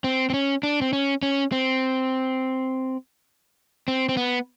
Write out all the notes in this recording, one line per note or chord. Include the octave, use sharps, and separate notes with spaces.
C4
C4
C#4
D4
C4
C#4
C#4
C4
C4
C4
B3